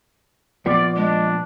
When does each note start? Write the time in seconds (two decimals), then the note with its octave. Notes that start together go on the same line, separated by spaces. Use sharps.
0.66 A#2 F3 B3 D5
0.96 G#3 D4